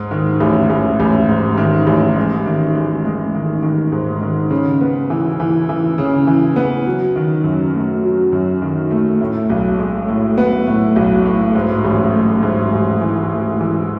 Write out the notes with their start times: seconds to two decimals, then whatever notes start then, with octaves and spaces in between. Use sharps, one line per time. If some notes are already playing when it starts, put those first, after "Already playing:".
Already playing: G#2
0.11 D#3
0.40 A1
0.70 A1
1.00 A1
1.28 G#2
1.58 D#3
1.87 A1
2.17 G#3
2.46 D#3
2.75 G#3
3.05 G#3
3.34 D#3
3.63 D#3
3.92 G#2
4.22 D#3
4.51 C#3
4.81 B3
5.10 E3
5.40 E3
5.69 E3
5.98 C#3
6.27 E3
6.56 B3
6.85 F#3
7.16 D#3
7.44 F#2
7.74 A3
8.03 F#3
8.32 F#2
8.62 D#3
8.91 A3
9.21 A2
9.49 B1
9.79 G#3
10.08 A2
10.38 B3
10.67 A2
10.96 B1
11.26 A2
11.55 G#2
11.84 A1
12.13 A3
12.43 G#2
12.73 A1
13.01 E3
13.32 A3
13.61 E3